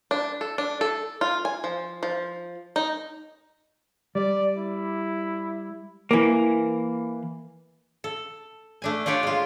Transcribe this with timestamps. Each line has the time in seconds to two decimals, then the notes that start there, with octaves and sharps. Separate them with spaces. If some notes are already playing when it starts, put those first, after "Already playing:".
0.11 D4
0.41 A4
0.58 D4
0.81 A4
1.21 F4
1.45 G#5
1.64 F3
2.03 F3
2.76 D#4
4.15 G3 D5
4.58 E4
6.11 E3 A#3
8.04 A4
8.82 A3 D4 G#5
9.06 D4 F4 G4 C#5 D5
9.23 G#3 F4